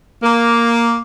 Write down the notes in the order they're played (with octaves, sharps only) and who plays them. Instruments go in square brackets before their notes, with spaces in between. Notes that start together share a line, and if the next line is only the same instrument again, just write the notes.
[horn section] A#3